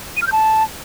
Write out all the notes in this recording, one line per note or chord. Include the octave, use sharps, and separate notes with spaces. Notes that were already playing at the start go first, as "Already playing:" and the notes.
D#7
F6
G6
A5